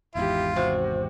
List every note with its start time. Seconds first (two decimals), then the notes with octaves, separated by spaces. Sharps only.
0.15 G#1 E2 G#2 E4 F4 G4
0.56 C3 F#4